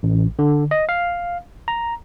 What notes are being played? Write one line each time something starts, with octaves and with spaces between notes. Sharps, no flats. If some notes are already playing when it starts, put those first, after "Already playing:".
A1
D3
D#5
F5
A#5